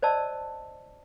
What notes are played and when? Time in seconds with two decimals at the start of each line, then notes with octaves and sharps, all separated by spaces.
0.02 C5 D5 D#5 A5 E6